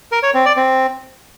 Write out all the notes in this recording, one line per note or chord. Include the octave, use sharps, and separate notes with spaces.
A#4
C#5
C4
D5
C4